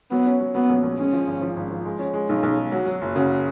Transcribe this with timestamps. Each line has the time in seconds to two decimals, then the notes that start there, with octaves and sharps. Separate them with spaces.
0.11 F#3 B3
0.26 C#4
0.40 F#3
0.55 F#3 B3
0.69 A#1
0.83 A#1
0.98 G#3 C#4
1.13 F3
1.27 G#1
1.42 F3
1.57 G#1
1.71 F3
1.85 G#3
1.99 C#4
2.14 G#3
2.29 B1 D#4
2.43 B1
2.57 G#3
2.72 F#3 F#4
2.86 F#3
3.01 F#1
3.16 C#3 F#4